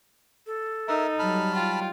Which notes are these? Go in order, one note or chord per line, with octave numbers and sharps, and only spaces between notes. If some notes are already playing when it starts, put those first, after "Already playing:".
A4
D#4 A#4 E5
F#3 G3 A5 B5 F6
F4 G5